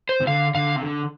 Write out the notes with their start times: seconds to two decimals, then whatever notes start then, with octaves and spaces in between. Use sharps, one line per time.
0.09 C5
0.21 C3
0.27 D3 F5
0.55 D3 F5
0.76 C3
0.82 D3